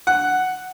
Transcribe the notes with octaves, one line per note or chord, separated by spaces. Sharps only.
F#5